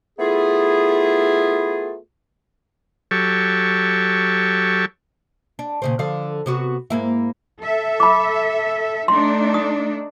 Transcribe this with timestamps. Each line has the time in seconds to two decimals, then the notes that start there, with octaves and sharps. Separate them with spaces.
0.19 A3 B3 E4 F4 G#4
3.11 F#3 G4 A4 C#6
5.59 D4
5.82 A#2 C#3 C4
5.99 D3 F3 F5
6.46 C3 B3 F#4
6.90 G#2 A#3 E4
7.60 A4 E5
8.00 B5 D6
9.08 A3 D4 D#4 C6
9.54 D#6